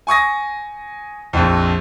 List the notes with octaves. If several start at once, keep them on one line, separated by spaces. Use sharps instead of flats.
G#5 C#6 D#6 A#6
A#1 F2